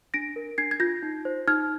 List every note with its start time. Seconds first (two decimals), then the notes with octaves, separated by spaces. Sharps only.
0.14 D4 A#6 D7
0.36 A#4
0.58 D4 G#6 C7
0.71 G#6
0.80 F4 G6 A#6
1.03 D#4
1.25 C5
1.48 D#4 F6 G#6